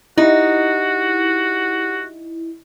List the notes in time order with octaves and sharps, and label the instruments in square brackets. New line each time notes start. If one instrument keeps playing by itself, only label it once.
[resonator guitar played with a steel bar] D#4 [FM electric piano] E4 [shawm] F#4 [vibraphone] G4 F#5